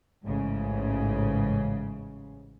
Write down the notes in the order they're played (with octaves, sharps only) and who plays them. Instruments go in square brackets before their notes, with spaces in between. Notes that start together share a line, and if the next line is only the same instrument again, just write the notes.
[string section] A1 G#2 C#3